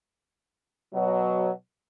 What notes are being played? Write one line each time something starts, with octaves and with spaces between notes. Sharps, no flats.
B2 F#3